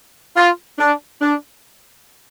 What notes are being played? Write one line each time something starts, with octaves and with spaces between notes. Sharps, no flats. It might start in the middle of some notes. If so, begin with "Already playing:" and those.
F4
D4
D4